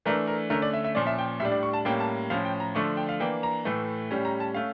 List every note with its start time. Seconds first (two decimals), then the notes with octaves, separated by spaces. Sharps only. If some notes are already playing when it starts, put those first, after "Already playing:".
0.05 E3 A3 D4 A#4
0.27 A#4
0.50 D3 A3 C#4 A#4
0.62 D5
0.73 E5
0.85 E5
0.95 A#2 F3 C#4 D5
1.07 E5
1.18 G5
1.40 A2 G3 D4 E5
1.52 D5
1.63 C#6
1.73 A5
1.85 A2 G3 A#3 C#4 G5
2.00 A5
2.30 A2 F3 C#4 F5
2.45 G5
2.60 A#5
2.75 D3 F3 A3 D4 C#6
2.97 G5
3.09 F5
3.20 E3 A#3 D4 G5
3.43 A#5
3.65 A2 E3 A3
4.11 A2 G3 C#4
4.25 A#5
4.40 A5
4.54 A3 C#4 F5